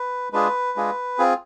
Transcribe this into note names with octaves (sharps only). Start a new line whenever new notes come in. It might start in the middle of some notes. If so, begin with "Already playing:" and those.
Already playing: B4
G#3 D4 F4 G#4 B4
G#3 D4 F4 G#4
C4 F4 G#4